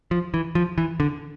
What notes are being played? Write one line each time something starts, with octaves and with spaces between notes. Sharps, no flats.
F3
E3
F3
E3
D3